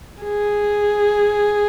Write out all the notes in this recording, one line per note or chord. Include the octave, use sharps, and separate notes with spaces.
G#4